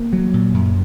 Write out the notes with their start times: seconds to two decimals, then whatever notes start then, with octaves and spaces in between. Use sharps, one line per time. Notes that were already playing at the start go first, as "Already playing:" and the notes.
Already playing: A#3
0.13 F#3
0.34 A#2
0.54 F#2